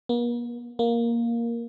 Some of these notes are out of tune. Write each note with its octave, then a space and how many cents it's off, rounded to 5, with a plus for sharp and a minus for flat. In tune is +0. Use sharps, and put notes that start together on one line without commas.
A#3 +45
A#3 +5